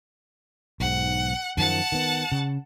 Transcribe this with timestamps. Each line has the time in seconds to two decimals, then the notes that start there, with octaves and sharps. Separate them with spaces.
0.80 B1 G#2 F#5
1.57 F#2 D#3 F3 F#5 A5
1.92 D#3 B3
2.32 C#3